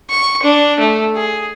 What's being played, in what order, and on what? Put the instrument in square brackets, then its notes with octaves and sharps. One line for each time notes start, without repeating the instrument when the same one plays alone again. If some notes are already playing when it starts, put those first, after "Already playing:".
[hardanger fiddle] C#6
D4
A3
G#4